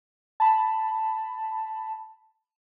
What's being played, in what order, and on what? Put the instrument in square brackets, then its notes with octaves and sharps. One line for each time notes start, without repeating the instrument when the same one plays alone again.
[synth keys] A5 B5